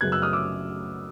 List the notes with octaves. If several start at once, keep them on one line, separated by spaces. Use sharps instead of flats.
F#2 C#3 F#3 B3 F#6 G#6
E6 F#6
D#6 F6
D6 E6